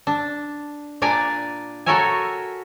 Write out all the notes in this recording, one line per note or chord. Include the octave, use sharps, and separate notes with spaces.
D4
A#2 D4 D5 G#5 A#5
F#4 A4 A#4 C#5 E5 G#5